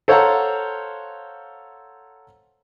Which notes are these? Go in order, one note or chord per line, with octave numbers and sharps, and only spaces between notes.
A4 C5 C#5 F5 F#5 A#5